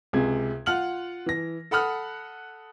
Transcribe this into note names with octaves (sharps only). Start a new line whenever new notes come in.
C#2 C3 G#4 G#6
F4 F#5 F6 F#7
E3 A#6
A4 F#5 B5 D#6 F6 F#6